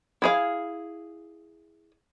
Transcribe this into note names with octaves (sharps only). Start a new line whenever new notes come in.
E4 G#4 F5